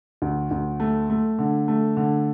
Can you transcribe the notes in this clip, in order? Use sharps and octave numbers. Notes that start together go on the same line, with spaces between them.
D2
D2
A3
A3
D3
A3
D3